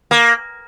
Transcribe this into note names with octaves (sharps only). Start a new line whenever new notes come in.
A#3